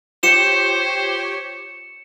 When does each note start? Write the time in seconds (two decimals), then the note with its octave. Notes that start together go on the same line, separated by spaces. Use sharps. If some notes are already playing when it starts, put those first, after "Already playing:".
0.23 F4 G4 C5 C#5 C#7 E7